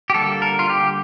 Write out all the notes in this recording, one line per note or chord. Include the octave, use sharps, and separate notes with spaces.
G4
D3 G3 A#3 A4
A#4
F4
G4